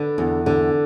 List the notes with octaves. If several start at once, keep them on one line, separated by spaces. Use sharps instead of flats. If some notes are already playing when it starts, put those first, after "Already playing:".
Already playing: D3 B4
E2
D3